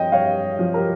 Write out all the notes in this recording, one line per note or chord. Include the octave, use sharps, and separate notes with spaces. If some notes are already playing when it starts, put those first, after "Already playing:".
Already playing: G2 F3 C#5 D#5 G5
G2 C#5 F5
F3
G4 A#4